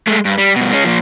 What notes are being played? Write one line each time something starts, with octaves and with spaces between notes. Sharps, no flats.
G#3 A3
G2
G3
G2 B2
G#3 C#4
A#2 F3